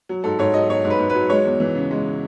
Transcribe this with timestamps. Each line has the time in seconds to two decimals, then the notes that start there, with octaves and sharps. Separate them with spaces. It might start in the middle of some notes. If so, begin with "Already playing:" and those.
0.09 F#3
0.24 G#2 A4
0.39 G#2 C#5
0.54 F#3 D#5
0.69 F#3 C#5
0.85 G#2
0.90 B4
0.99 G#2
1.10 B4
1.15 F#3
1.30 G#3 C#5
1.45 E2
1.60 E3
1.75 C#3
1.91 G#3